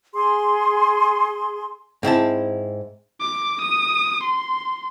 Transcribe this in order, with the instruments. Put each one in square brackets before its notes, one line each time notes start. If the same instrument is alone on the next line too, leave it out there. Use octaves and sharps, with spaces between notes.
[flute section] G#4 C6
[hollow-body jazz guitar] G#2 C4 E4 A5
[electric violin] D6
D#6
C6